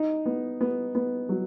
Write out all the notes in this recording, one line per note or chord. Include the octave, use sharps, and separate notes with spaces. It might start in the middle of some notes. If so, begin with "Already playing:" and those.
Already playing: D#4
B3
B3
B3
F#3